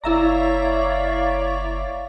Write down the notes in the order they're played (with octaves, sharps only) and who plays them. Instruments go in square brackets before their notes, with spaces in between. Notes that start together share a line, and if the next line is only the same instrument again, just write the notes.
[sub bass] F#1 [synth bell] E4 E5 A#5 [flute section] C#5 F5 C#6 [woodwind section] D5